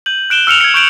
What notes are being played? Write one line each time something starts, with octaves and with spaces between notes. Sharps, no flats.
G6 D#7 F#7
F#6 D7 E7 G7
E6 F6 C#7 E7 F7
G#6 C#7
C#6 G6 D7 F#7